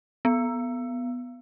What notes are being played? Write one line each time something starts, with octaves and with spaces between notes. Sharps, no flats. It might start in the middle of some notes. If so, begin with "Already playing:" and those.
B3